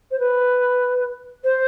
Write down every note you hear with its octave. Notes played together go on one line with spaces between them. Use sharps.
C5
B4
C5